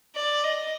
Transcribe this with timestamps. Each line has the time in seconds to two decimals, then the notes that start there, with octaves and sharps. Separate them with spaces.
0.16 D5
0.44 D#5